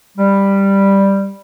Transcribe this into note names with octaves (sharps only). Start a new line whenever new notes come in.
G3